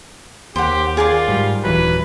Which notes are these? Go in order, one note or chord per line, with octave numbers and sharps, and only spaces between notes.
D#2 G4 C5 F#5
F4 G#4 A#4 D5
G#2 G3
D#1 E3 F#3 B4